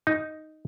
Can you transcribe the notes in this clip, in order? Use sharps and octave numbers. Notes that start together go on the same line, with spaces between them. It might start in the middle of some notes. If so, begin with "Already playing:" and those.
D#4